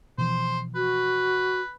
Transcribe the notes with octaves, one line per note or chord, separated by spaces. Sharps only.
B2 E3 F3 C5
F#4 B4